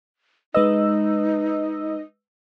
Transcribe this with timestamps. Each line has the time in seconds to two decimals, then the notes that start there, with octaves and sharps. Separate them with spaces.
0.54 G#3 D#4 B4 D#5 E6